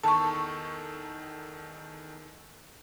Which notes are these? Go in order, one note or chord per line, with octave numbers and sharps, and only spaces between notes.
E2 D#3 A4 A5 C#6